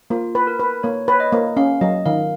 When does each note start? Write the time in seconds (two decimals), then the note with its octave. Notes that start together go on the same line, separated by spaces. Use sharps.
0.10 A#3 F4
0.35 B4
0.47 A#4
0.59 B4
0.83 A#3 C#5
1.08 B4 C#5
1.20 D#5
1.32 A#3
1.57 C#4 F5
1.81 F#3 D#5
2.06 D#3 F5